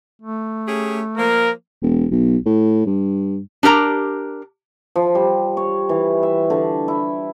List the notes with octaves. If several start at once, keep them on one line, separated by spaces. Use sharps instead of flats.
A3
C#4 G4 G#4
F3 A#3 A#4
E1
B1
A2
G2
D4 G4 A#4 A#5
F3
G3
C#5
E3
E5
D3
E4